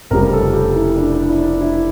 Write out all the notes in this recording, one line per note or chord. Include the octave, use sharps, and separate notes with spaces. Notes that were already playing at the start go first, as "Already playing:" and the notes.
F1 F2 C#3 G3 A#4
A4
G4
E4
D4
D4
E4
D4
E4